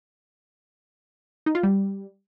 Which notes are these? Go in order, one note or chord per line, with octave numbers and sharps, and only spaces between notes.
D#4
F4
G3